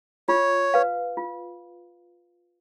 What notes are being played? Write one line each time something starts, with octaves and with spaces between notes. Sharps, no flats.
F4 C#5
B4 F5
F4